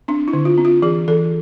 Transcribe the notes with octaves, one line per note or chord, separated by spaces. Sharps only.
C4 D4
E4
D3
F4
C4
F4
E3 G#4
E3 A4